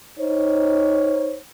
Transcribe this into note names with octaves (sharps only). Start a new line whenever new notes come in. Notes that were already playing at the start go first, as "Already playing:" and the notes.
D#4 C5 C#5